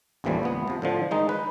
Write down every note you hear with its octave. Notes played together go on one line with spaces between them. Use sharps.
A1 D#2 A2 E3 F3 G3
C#2 B3
C3 F3
A2 D3 F3
D#3 G#3 D#4
B4